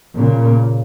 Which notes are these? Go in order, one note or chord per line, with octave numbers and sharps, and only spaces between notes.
A#2 C#3